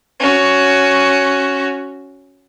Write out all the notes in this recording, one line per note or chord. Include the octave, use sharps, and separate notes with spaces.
C#4 F#4